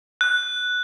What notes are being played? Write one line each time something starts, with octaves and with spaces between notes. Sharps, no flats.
F#6